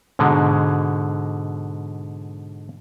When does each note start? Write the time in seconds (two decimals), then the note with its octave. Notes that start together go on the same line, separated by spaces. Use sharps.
0.19 G#2 B2 D3 G#3